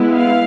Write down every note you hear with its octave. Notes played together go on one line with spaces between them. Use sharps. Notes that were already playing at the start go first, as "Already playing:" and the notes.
Already playing: G#3 B3 E4
F5